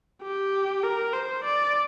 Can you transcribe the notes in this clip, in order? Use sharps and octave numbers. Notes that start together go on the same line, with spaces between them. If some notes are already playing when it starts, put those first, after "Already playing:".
G4
A#4
C5
D5